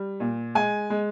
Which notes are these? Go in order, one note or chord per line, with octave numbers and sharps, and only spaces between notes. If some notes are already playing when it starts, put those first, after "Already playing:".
Already playing: G3
A#2
G#3 G#5
G#3